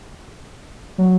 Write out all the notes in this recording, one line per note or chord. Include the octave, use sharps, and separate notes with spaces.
F#3